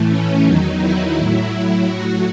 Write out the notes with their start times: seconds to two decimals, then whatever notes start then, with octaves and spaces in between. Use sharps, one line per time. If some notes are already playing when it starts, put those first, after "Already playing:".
Already playing: A2 E3 A3
0.09 C#4
0.45 E2 D#3 F#3 D#4
0.80 E4
1.17 A2 F#3 E4
1.89 A2 F#3 F#4